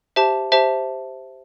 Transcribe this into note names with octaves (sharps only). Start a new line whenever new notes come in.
G4 C5 E5 A5
G4 C5 E5 A5